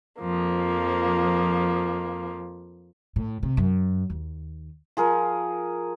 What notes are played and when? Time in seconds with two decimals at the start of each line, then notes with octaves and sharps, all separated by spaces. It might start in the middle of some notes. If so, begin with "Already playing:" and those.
0.20 F2 F3 A#3
3.16 A2
3.43 C3
3.57 F#2
4.10 D#2
4.97 F3 G#4 A#4